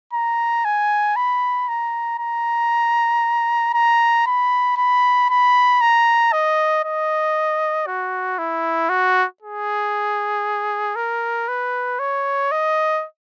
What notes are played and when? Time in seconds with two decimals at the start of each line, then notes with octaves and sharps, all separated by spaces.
0.13 A#5
0.65 G#5
1.16 B5
1.68 A#5
2.19 A#5
3.74 A#5
4.26 B5
4.77 B5
5.29 B5
5.81 A#5
6.32 D#5
6.84 D#5
7.87 F#4
8.38 E4
8.89 F#4
9.42 G#4
10.96 A#4
11.48 B4
11.99 C#5
12.52 D#5